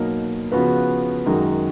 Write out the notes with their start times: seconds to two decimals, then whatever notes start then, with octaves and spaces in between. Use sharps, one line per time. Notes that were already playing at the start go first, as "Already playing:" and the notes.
Already playing: B2 F#3 A#3 D#4
0.52 C#3 F3 B3 F#4 B4
1.26 F#2 D#3 G#3 D#4 F#4